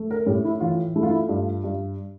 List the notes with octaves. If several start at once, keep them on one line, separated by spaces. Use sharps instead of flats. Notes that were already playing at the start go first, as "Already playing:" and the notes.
Already playing: A3
A#4
A2 G4
E4
E3 F4
A3 E4
F4
E4
G2 F4
G2